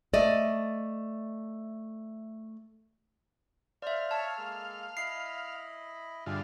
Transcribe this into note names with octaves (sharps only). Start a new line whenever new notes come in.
A3 D5 D#5
C5 D5 E5 F5
C#5 A5 C#6 E6
G#3 A#3 A4
E4 D#5 B5 C7
G2 D3 E4 F4 G#4